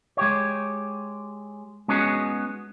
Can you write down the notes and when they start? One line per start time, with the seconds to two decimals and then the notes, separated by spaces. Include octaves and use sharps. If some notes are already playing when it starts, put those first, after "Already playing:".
0.17 G#3 G4 C#5
1.88 G#3 B3 C#4 D#4 F#4 G#4